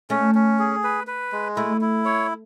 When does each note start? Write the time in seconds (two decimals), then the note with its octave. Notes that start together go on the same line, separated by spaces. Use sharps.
0.10 A3 C#4
0.35 C#4
0.59 G#4
0.83 B4
1.07 B4
1.32 G#3
1.56 A3 E4
1.81 E4
2.05 C#5